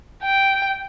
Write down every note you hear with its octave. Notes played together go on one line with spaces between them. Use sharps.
G5